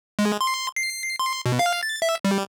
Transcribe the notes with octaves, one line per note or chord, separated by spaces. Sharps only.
G#3
C6
C7
C6
B2
F5
A6
E5
G3